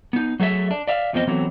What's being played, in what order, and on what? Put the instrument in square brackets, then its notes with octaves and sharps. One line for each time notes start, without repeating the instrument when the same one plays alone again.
[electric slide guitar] B3 D#4
F#3 A3 G#4 A4 E5
D4
D5 E5 F5
E2 F3 B3 C4 D#5
E3 F#3 A3 B3 C4